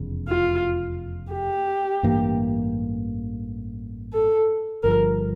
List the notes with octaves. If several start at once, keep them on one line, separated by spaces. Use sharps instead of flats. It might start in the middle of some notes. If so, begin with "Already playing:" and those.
Already playing: F1 E2 C#3
F4
G4
A1 G2 E3 A#3
A4
G1 G2 F3 A#4